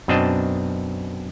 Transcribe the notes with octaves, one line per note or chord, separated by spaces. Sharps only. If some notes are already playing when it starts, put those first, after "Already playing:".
F#2 B2 C4 D4 D#5 A5